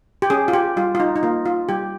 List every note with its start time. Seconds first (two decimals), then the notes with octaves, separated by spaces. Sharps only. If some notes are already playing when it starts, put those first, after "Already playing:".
0.22 G4
0.30 C#4 G#4
0.48 F4
0.53 G4
0.77 G3 F4
0.95 F4
1.00 D#4
1.16 D#4
1.23 A#3 F4
1.46 F4
1.69 G3 G4